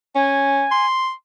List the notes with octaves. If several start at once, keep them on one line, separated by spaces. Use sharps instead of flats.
C#4 G#5
C6